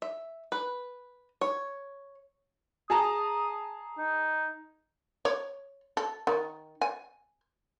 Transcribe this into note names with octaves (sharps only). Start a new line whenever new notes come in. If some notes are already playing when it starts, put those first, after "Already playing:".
E5
B4
C#5
G#4 A5 A#5 D#6
D#4
C#5
A4
D#3
G#5